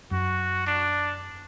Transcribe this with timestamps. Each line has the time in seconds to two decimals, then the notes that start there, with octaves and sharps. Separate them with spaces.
0.11 F#2 F#4
0.67 D4